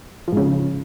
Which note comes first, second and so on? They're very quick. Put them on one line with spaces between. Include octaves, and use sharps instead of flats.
F3 G#2 C#3